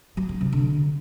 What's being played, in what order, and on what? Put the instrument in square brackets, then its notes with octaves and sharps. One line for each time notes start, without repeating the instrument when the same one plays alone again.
[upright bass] F#3
D3
C3
D3